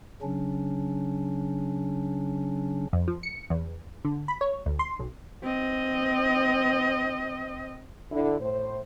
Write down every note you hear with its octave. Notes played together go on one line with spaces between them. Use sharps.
C#3 F#3 C#4 D4
F2
F3
C#7
E2
D3
B5
C#5
D2
C6
B1
C4 D#5
D3 E4
A2 C5